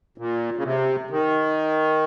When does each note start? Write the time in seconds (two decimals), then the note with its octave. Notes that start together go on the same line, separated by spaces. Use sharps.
0.18 A#2
0.57 C#3
0.64 C3
1.10 D#3